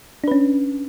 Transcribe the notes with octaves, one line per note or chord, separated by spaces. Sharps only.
C#4 D4 B4